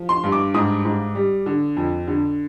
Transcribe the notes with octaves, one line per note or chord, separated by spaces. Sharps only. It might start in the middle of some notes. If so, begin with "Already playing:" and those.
Already playing: F3
C6
G2
D6
G#2 D#6
G#2
G3
D3
F2
D3